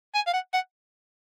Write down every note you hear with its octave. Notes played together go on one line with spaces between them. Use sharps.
G#5
F5
F#5
F#5